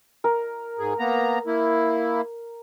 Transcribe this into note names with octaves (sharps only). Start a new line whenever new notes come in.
A#4
G#2 G#4
A#3 B3 A#5
A#3 E4